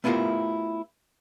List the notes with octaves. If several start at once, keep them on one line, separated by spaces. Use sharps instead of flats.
A3 B3 E4 F4 G4 A#4